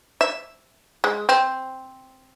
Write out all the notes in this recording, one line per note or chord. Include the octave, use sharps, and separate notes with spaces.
E5
G#3
C4